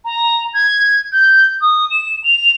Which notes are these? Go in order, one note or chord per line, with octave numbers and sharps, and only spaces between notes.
A#5
G#6
G6
D#6
E7
F7